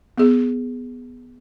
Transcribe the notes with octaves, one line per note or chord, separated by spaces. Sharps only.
B3 G#4